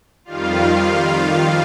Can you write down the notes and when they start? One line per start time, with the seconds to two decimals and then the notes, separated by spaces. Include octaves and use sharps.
0.25 F2 D#3 G3 F4 F5